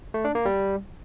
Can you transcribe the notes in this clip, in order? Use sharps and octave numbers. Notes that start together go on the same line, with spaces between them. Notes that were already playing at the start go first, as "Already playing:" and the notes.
A3
D4
A#3
G3